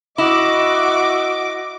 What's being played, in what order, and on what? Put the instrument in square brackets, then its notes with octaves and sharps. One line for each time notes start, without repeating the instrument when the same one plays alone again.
[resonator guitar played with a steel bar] E4 [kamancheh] F#4 E5 [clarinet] D#5 [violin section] D6